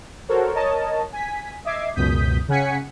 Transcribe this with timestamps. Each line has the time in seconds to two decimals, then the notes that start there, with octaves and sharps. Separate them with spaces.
0.29 F#4 A4 A#4 C5 C#5
0.54 A#4 C#5 D#5 A5
1.13 G#5 B6
1.65 D#5 E5 D6 G#6 C7
1.95 C#2 F#2 B2 D#6 G6 B6
2.48 C#3 C#4 F#5 G#5 B6 C#7